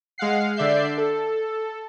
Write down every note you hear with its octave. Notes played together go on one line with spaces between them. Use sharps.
G#3 F5 F#5 C7
D3 D5 E5 G6 C7
A4